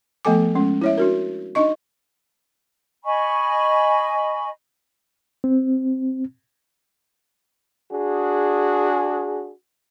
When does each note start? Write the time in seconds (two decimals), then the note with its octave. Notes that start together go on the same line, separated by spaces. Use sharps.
0.25 F3 A3 B3 A4 G#5 D6
0.55 G#3 C#4
0.81 E4 C#5 E5
0.98 D4 F#4 A#4
1.55 D4 D#4 D#5 C#6
3.05 D#5 G#5 B5 C#6
5.44 C4
7.92 D4 F#4 G#4